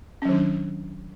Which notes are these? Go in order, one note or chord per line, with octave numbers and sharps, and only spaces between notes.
D#3 F#3 C#4 D4